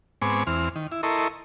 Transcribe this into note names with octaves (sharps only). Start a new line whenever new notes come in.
G#2 B3 C4 G#5 C#6 D6
E2 C4 F6
D#3
E4
E4 A4 A#4 D#5 C6 C#6